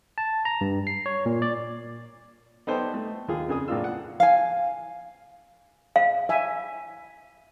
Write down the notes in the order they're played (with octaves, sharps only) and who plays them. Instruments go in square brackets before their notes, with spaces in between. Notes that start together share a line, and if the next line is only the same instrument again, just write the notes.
[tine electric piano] A5
A#5
G2
C7
C#5
A#2
D5
[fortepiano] B3 D#4 A4 C5 D5 G5
A3
D#2 F4 G#4
F2 C#3 G#4 D#6
A2 A#3 D4 F4 E6
F#5
[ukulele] F5 G#5
[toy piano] F5
[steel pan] E5 G#5